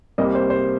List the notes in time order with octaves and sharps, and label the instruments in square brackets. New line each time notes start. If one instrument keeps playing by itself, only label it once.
[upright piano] C2 C3 G3 A#3 D#5
C5
C5